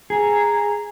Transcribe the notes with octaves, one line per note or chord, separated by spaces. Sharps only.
G#4 A#5